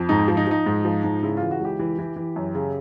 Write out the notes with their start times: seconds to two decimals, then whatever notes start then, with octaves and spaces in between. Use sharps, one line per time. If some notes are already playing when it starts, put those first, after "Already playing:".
Already playing: F2
0.09 G#2 D#4
0.28 F3
0.37 D#4
0.47 F3 D#4
0.66 G#2
0.85 F3
1.04 G#2
1.22 C#3 E4
1.37 E3 F4
1.51 F#4
1.60 C#2 G4
1.79 E3
1.99 E3
2.16 E3
2.36 F#2
2.55 C#3